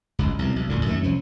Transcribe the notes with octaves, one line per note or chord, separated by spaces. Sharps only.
G1 C#2
C2 B2
B1
A1 D2 A#2 D3
F#2 D#3 G3 A3
C2 F3 C#4